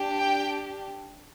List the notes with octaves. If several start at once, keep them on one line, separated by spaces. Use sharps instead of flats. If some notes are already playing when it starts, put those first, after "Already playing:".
Already playing: D4 G4
G5